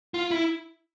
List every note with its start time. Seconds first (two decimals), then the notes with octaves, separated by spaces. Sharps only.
0.14 F4
0.31 E4